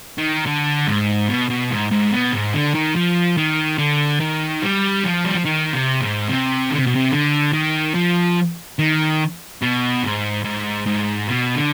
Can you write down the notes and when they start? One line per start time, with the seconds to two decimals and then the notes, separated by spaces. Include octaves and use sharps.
0.18 D#3
0.46 D3
0.87 G#2
1.29 B2
1.50 B2
1.71 G#2
1.92 G#2
2.12 B2
2.33 G#2
2.54 D3
2.74 D#3
2.95 F3
3.37 D#3
3.78 D3
4.20 D#3
4.62 G3
5.04 F3
5.25 G3
5.35 F3
5.45 D#3
5.73 C3
6.01 G#2
6.29 C3
6.70 D3
6.78 C3
6.87 B2
6.96 C3
7.12 D3
7.53 D#3
7.95 F3
8.79 D#3
9.62 B2
10.03 G#2
10.45 G#2
10.86 G#2
11.28 B2
11.55 D3